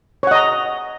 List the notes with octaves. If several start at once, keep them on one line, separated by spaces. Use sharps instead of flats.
C#5 D#5 F#5 A#5